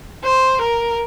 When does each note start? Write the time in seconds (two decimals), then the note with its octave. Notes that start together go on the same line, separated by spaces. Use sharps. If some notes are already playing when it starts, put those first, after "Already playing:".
0.25 C5
0.61 A#4